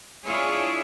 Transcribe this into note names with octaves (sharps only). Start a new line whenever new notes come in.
D4 E4 F4 G#4 C#5